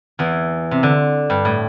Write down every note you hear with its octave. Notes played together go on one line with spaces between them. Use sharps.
E2 E3
C3
D3
G2
A2